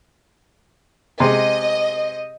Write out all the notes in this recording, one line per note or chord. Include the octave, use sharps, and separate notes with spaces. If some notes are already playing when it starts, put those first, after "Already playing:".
C3 G#3 D#5